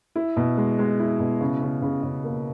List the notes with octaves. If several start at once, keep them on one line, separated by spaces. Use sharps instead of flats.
E4
B2
G#3
G#3
E4
B2
C#3
C#3
C#3
C#3
A#3